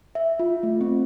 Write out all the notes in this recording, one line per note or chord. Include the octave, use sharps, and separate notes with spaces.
E5
F4
A3
C4